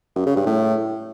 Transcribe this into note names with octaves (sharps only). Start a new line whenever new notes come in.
F#2
C#3
G2
A2